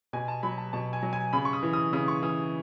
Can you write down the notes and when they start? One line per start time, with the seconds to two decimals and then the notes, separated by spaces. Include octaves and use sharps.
0.13 B2 G#5
0.28 A5
0.43 F#3 B5
0.58 A5
0.73 B2 A5
0.93 G#5
1.03 F#3
1.13 G#5
1.33 C#3 B5
1.45 C#6
1.53 D#6
1.63 E3
1.73 D#6
1.93 C#3 D#6
2.08 C#6
2.23 E3 D#6